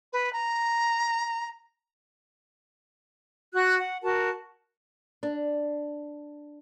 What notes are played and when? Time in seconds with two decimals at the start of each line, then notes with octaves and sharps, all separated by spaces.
0.12 B4
0.33 A#5
3.53 F#4 F#6
3.78 F#5
4.03 F#4 A#4 A5
5.23 D4